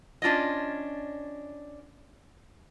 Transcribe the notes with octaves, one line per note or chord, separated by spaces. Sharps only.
C#4 D4 F4 D5 D#5